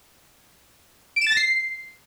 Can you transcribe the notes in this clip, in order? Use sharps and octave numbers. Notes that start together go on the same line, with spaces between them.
D7
E7
A6
A#6
C7